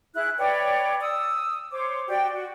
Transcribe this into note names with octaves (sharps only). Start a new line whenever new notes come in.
E4 G#4 F#6
B4 C#5 D5 G5
D#6 E6
C5 C#5 D6
F#4 G4 D5 G5
F#4